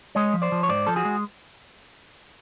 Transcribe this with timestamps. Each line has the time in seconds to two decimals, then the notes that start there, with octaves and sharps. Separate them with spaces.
0.15 G#3 C#5 D#5
0.34 F3
0.42 C5 D5
0.52 F3
0.63 C#5
0.69 G#2 C5 D5
0.87 F3 A4
0.96 F#4 G#4
1.05 G#3